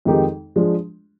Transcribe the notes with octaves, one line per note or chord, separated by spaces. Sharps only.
F2 D#3 G#3 D#4 G4
F3 G#3 D4